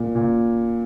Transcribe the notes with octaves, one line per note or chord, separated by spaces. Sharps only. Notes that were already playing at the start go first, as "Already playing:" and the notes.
Already playing: A#2
A#2